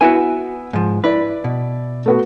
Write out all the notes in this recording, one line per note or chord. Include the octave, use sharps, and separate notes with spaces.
B3 E4 F#4 E5 G#5
G#2 F3
E4 B4 D5
B2
A3 B3 F#4